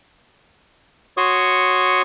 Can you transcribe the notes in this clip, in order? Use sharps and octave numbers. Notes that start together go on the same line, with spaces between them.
F#4 C#5 C6 C#6 D#6